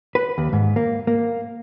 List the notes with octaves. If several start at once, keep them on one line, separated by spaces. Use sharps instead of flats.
B4
D#2
G#2
A#3
A#3